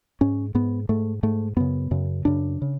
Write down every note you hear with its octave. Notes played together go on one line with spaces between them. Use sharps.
G#2 C#4
G#2 B3
G#2 A3
G#2 A3
F#2 C#3 B3
F#2 C#3
F#2 C#3 D4
C#3